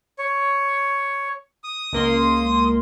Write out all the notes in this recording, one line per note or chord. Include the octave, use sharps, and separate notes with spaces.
C#5
D#6
C#2 A#3 C6